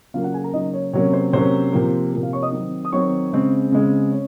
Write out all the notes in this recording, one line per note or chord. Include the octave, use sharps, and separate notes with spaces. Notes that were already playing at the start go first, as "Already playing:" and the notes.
C#3 F#3 A#3 F4 F5
F#4 F#5
G#4 G#5
A#4 A#5
C#3 F#3 A#3 D#4 D#5
C#5
C3 F#3 A#3 C#4 C#5
C5
C3 F#3 A#3 C#4 C5
C3 F3 A#3
C3 F3 A#3
F4 F5
C#5 C#6
D#5 D#6
D#3 F#3 C4
D#6
D#3 F#3 C4 C#5 C#6
C#3 G#3 C4
C#3 G#3 C4
C#4